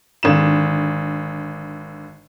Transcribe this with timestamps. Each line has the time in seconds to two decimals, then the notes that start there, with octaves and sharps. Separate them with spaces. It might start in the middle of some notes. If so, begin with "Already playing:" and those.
0.23 G#1 D3 E7